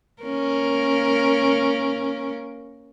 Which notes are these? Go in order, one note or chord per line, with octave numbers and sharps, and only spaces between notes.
A#3 C#4 A#4